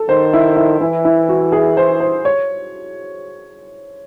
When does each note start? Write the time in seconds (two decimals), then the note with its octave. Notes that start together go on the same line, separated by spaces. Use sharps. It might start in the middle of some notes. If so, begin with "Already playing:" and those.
Already playing: A4
0.09 D#3 C5
0.33 E4
0.57 E4
0.81 E3 E4
1.05 E4
1.29 F#4
1.52 G#4
1.77 C5
2.00 C5
2.25 C#5